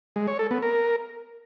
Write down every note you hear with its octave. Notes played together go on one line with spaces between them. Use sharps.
G#3
C#5
A4
B3
A#4